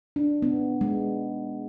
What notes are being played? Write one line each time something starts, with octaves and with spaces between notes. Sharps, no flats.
D4
B3
G#3